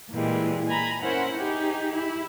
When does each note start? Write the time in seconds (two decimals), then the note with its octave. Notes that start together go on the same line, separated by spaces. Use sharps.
0.11 A#2 E3 G3 G#3
0.68 G#5 A#5 B5
1.02 C#4 E4 A#4 C5 F#5
1.36 D#4 G4 G#4
1.96 E4